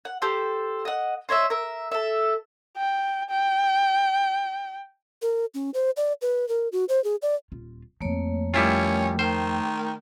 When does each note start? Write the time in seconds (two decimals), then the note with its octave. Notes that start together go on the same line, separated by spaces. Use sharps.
0.05 F#5
0.22 G4 A4 C5
0.85 D#5 F#5
1.29 C5 C#5 D#5 E5
1.50 A#4 E5
1.92 A4 E5
2.77 G5
3.30 G5
5.22 A#4
5.54 C#4
5.74 C5
5.97 D5
6.21 B4
6.48 A#4
6.72 F#4
6.89 C5
7.04 G#4
7.22 D5
7.52 D#1 F4
8.01 F2 F3 A3 A#3 C#5
8.54 G3 A3 C#4 E4 F4 A#4 G5
9.19 D#3 C5